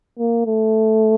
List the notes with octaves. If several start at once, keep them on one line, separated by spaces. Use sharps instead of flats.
A#3
A3